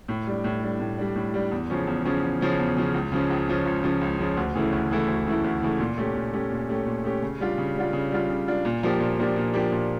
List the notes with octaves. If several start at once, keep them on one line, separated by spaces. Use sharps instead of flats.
A2
G3 D4
A2
G3 D4
A2
G3 D4
A2
G3 D4
E2
C#3 F3 C#4
E2
C#3 F3 C#4
E2
C#3 F3 C#4
E2
C#3 F3 C#4
C#2
C#3 F3 C#4
C#2
C#3 F3 C#4
C#2
C#3 F3 C#4
C#2
C#3 F3 C#4
D2
C#3 E3 A3 E4
D2
C#3 E3 A3 E4
D2
C#3 E3 A3 E4
D2
C#3 E3 A3 E4
A#2
A3 C#4 G4
A#2
A3 C#4 G4
A#2
A3 C#4 G4
A#2
A3 C#4 G4
C#3
G3 D4 F4
C#3
G3 D4 F4
C#3
G3 D4 F4
C#3
G3 D4 F4
A#2
F3 A#3 D4 G4
A#2
F3 A#3 D4 G4
A#2
F3 A#3 D4 G4
A#2